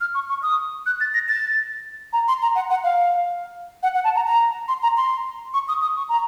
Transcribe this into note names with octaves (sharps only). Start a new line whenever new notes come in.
F6
C#6
C#6
D#6
F#6
A6
A#6
A6
A#5
C6
A#5
F#5
F#5
F5
F#5
F#5
A5
A#5
A#5
C6
A#5
C6
C#6
D#6
D#6
C#6
A#5